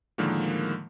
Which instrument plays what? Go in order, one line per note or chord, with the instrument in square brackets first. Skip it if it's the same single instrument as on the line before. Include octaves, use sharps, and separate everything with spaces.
[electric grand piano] A2 D3 D#3 F3 G#3 A#3